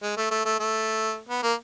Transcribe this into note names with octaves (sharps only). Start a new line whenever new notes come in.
G#3
A3
A3
A3
A3
B3
A#3